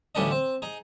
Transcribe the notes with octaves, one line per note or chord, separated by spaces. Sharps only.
A1 D2 G3 C#4 D4 D#5
C4
D#4 G#4